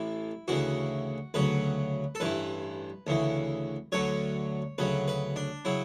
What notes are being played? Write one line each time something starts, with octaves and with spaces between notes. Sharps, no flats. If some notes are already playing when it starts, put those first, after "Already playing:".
Already playing: A1 A2 E3 E4
D2 C#3 E3 F#4
D2 C#3 F#3 B4
A4
A1 G2 E3 B4
D2 C#3 E3
D2 D3 F#3 C#5
D2 C#3 F#3 B4
B4
D4
C#3 F#3 E4